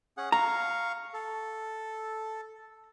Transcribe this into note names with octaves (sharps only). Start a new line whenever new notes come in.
C#4 G#4 F#5
F5 A#5 C#6
A4